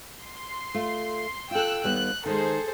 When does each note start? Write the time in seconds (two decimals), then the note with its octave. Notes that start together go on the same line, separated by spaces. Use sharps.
0.23 C6
0.74 A3 F4
1.51 F4 A4 G5 E6 F#6
1.84 D#2 G3 B3 F#6
2.26 D#3 G#3 G#4 A4 C5